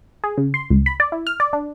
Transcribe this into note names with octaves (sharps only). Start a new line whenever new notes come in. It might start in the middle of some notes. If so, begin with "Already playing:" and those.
G#4
C#3
C6
C#2
B5
D5
E4
F6
D5
D4